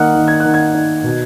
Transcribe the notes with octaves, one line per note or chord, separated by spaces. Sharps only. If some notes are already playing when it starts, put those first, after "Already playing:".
Already playing: D#3 A#3 D#4 F#5 F6 F#6
D#3
G#6
D#3 F#6
G#6
D#4
B2